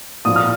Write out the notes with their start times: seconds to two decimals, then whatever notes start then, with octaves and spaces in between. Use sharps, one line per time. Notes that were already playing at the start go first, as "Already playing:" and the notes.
0.25 A#2 F3 D#6
0.36 F6